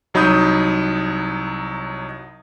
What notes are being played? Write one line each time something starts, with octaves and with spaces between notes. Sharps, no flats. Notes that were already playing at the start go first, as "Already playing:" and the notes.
C2 F#3 D#4 B5 D#6 G6